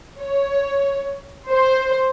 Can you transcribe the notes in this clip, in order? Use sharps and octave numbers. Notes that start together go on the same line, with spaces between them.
C#5
C5